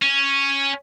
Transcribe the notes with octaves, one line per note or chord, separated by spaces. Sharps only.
C#4